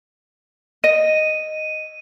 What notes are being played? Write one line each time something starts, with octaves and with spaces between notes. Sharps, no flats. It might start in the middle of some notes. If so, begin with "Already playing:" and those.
D#5 D#7